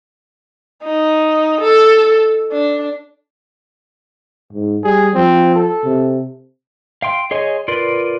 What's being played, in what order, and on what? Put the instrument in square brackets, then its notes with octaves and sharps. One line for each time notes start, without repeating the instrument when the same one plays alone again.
[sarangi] D#4
A4
D4
[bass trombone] G#2
[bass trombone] G3 [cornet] G#4
[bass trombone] F3 [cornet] C4
[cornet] A4
[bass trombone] C3
[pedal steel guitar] F5 G5 C6
G#4 C#5 D#5 G#5 C6
F4 A#4 B4 D5 C6